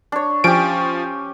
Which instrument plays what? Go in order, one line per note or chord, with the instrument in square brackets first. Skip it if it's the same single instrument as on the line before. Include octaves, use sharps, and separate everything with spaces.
[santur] D4 C#5
[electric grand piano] F3 D7 [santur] C#4 G4